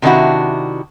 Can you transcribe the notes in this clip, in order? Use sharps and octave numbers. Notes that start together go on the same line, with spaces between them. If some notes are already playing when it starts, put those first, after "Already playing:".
C3 D#3 D4 E4 F#4